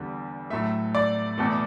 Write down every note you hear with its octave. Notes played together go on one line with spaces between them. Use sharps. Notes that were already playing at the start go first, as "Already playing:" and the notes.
Already playing: E2 D3 G3
A2 F#3 A3 E5
D5
E2 B2 A3